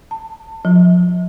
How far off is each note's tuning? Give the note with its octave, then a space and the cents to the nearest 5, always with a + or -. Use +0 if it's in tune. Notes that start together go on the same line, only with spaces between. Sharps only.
A5 +25
F3 +35